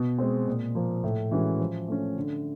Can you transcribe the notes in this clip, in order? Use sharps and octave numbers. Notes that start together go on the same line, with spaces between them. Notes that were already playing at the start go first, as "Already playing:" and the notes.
Already playing: B2
G#3 C4
A#2
F3 A#3
A2
E3 G#3 C#4 F#4
F3
A3 C#4
D3